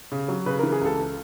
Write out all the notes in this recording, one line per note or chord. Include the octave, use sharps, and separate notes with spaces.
C#3
F#3
C#3 B4
E3 A#4
G#4
C#2 A4